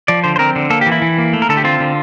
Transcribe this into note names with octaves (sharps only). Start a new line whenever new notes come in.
F3 D5
D3 C5
C5
C4 A#4
D3
A#3 A4
G4
E3
E4
E3
A#3
A3
A#4
D3 A4
G4
C4 F4
D3